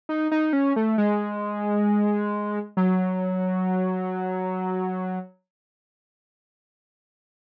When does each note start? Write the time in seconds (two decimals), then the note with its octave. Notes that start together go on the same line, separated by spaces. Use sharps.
0.09 D#4
0.32 D#4
0.53 C#4
0.76 A3
0.98 G#3
2.77 F#3